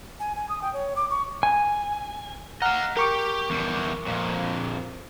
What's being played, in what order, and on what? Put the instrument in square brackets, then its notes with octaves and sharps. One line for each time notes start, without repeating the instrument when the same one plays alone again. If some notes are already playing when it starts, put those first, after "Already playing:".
[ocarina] G#5
G#5
D#6
G5
C#5
D6
C#6
[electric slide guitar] G#5
[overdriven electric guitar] D#5 F5 [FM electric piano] F#5 A#5 F6
[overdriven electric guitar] G4 [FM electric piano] A#4 C#6 D6
[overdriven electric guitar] E2 G3
F2 A#2